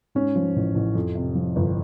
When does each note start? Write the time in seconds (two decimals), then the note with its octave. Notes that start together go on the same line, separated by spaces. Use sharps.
0.15 G#2 C#4
0.36 F3
0.56 A1
0.75 A1
0.95 F2
1.15 C3
1.35 F3
1.56 G1